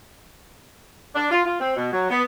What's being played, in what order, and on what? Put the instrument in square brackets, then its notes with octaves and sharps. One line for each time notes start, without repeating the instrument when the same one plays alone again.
[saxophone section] D4
F4
F4
C4
B2
F#3
B3